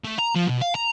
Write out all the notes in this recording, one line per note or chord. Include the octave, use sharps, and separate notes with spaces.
A3
A#5
F3
B2
F5
A#5